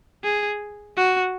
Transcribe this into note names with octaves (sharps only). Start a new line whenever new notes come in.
G#4
F#4